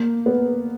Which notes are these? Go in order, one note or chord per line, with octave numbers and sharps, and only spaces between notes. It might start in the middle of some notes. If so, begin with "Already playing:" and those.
Already playing: A#3
B3